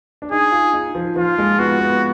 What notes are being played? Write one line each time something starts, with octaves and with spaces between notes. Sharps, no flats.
D4
D#4 G#4
F4
D#4
F3
F3 F4
G#3
B3 F#4
B3